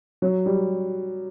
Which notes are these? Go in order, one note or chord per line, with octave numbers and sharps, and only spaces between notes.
F#3
G3